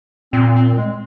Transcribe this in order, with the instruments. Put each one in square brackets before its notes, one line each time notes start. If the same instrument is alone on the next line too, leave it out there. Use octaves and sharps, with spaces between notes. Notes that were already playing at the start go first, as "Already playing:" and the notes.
[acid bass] A#2 [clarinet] C4
[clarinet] C4
G#3